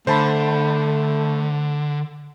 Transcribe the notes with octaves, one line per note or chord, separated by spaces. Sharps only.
D3 A3 C5 A5 B5